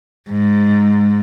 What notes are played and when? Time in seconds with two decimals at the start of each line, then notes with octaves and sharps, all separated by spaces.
0.29 G#2